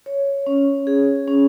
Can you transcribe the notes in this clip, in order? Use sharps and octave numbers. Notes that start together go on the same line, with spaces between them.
C#5
C#4
G#4
C#4